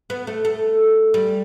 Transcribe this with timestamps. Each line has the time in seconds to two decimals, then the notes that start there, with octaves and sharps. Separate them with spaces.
0.10 B3
0.27 A3
0.45 A3
1.14 G3